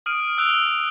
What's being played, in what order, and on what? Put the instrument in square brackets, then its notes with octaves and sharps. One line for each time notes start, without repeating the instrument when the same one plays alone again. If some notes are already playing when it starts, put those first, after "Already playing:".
[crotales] D#6 F6 D7 D#7
E6 F#6 D7 F7